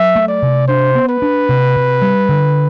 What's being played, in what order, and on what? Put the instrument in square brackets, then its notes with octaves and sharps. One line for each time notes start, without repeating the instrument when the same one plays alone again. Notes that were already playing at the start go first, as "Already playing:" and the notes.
Already playing: [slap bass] F#3 [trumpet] E5
[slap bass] A3
[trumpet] D5
[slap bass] C3
[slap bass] D4 [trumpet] C5
[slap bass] B3
[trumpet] B4
[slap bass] D4
C3
C3
G3
D3